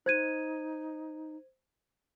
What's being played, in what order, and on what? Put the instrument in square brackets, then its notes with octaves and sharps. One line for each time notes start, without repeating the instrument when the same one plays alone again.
[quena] D#4 [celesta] C5 G#6 D#7